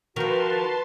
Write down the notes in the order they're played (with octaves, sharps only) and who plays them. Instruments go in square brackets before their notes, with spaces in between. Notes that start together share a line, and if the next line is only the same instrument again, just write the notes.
[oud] D#3 F3 [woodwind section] F#4 [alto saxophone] A#4 [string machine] B4 A5 C6